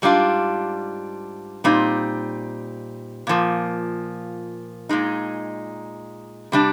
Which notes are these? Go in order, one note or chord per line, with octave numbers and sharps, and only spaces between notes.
G#2 G3 D4 F4
A#2 G3 C4 D#4
A#2 F3 A#3
A#2 G#3 D#4
C3 G3 D4